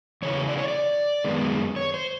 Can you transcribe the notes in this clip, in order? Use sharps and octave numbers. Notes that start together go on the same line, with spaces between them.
E2 C#3 E3 C#5
D5
C#5
D5
F#2 D#3 G#3 B3
C#5
C5